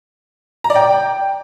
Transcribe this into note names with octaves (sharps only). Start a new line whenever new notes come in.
A#5
D5
G5